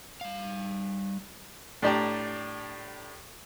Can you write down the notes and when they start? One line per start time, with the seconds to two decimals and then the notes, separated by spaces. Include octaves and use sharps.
0.21 G3 F5
1.82 A2 D4 G4 D5 A5 A#5